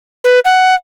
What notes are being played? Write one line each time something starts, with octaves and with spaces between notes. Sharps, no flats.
B4
F#5